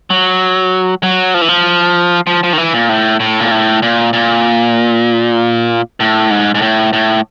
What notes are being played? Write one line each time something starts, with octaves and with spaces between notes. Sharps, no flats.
F#3
F#3
F3
E3
F3
F3
F3
D#3
E3
A#2
A2
A2
A#2
A2
A#2
A#2
A2
G#2
G#2
A2
A2